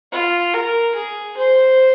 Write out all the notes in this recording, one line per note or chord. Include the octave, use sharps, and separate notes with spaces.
F4
A#4
G#4
C5